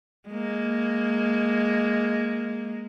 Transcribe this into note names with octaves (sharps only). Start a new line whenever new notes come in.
G#3 A#3